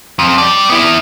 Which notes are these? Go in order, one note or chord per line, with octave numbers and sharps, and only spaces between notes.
F2
G4 D5
B3 E4